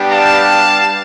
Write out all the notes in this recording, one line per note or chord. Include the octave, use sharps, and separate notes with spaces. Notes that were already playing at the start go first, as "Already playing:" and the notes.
Already playing: G3 B3 D4 G4
F5 A5